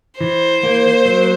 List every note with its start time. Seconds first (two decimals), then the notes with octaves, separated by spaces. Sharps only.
0.21 E3 C5
0.63 A#3
1.05 F#3